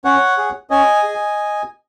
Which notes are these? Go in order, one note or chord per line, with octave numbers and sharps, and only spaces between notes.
C#4 C#5 F#5
G#4
C#4 D#5 G#5
G#4